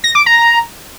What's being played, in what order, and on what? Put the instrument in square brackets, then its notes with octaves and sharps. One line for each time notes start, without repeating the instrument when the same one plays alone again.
[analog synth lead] A#6
D6
A#5